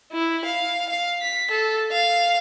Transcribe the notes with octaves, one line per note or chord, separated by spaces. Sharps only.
E4
F5
F5
B6
A4
F5